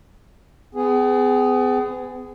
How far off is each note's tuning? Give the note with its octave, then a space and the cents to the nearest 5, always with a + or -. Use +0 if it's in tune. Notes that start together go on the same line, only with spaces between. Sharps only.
B3 +40 G#4 +0